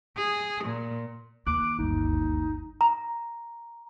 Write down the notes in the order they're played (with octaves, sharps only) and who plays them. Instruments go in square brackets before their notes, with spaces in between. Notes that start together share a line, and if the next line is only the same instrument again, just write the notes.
[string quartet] G#4
A#2
[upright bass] D#2 [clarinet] D6 [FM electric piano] F#6
[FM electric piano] G1 D2 G2 [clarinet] D#4
[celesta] A#5